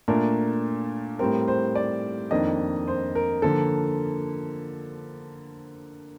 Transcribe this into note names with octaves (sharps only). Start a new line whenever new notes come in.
A#2 A3 D4 A#4
A2 G3 C4 A#4
C5
D5
F2 D#3 A#3 D4 D#5
C5
A#4
D3 F3 A#3 A4